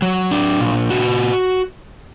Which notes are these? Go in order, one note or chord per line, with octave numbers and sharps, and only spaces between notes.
F#3
D4
A#2
F#4